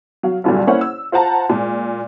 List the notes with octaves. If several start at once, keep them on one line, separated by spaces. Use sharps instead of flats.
F#3 F5
C2 G2 A#2 D3 F#3 G3
A#3 C#4 E4 C5 C#5 F#5
E6
F4 C5 F#5 A5 A#5
A#2 G#3